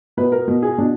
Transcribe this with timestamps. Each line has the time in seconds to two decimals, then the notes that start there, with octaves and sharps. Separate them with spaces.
0.17 B2 B4
0.32 A#4
0.48 B2
0.63 G#4
0.78 B2 D4